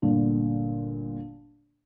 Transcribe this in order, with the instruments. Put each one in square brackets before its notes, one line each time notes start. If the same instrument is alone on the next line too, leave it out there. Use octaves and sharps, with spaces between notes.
[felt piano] G1 A#2 D3